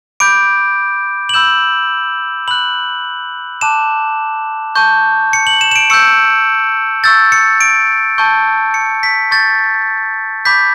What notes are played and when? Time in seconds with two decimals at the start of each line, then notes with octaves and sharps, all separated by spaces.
0.20 B5 D6 G6 D7
1.29 F#7
1.34 B5 E6 G6 E7
2.48 B5 F#6 F#7
3.61 A5 D6 F#6 E7
4.75 A5 C#6 G6
5.33 C#7
5.47 F#7
5.61 E7
5.71 E7
5.76 D7
5.90 C#6 E6 G6 C#7
7.04 C#6 E6 G6 A6
7.32 C#7
7.61 D7
8.18 A5 C#6 G6
8.74 C#7
9.03 B6
9.31 C#6 G6 A6
10.45 B5 D6 G6 B6